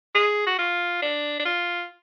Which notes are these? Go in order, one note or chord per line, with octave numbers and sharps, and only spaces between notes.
G#4
F#4
F4
D4
D4
F4